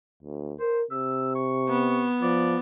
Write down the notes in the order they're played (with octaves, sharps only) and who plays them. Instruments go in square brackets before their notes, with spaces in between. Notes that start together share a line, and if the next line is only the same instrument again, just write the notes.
[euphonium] D2
[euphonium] A#4 [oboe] C5
[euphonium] C3 [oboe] E6
[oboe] C#6
[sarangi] B3
[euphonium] F3 [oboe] D5